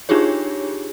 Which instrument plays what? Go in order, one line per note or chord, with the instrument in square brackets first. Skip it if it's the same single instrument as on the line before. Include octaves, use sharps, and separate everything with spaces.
[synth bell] D4 D#4 F4 G4 G#4 C#5